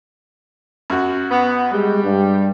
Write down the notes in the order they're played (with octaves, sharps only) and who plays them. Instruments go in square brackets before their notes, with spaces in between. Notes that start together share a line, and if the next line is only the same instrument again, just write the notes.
[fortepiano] F#2 F#4
[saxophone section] B3
[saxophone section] G3 [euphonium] G#3
[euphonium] G2